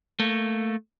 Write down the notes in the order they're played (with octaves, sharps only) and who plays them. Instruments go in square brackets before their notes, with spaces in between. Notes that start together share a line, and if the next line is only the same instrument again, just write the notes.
[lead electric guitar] A3 A#3